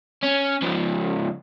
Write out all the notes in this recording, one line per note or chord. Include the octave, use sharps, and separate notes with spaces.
C#4
C#2 F3